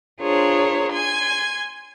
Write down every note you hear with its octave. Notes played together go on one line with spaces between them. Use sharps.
D4 F4 G#4 A#4 C5 C#5
G#5 C6 G#6